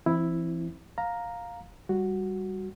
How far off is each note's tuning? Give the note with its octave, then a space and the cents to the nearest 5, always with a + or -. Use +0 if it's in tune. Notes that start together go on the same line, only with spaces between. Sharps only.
E3 +40 C4 +0 E4 +0
F5 +15 A#5 +0
G3 +0 F#4 +0